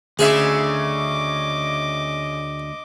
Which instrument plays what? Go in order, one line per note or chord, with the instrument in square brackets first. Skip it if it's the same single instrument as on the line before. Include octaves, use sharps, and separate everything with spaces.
[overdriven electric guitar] D2 [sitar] C#3 C#4 E5 [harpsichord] G#4 [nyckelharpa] D#5 D6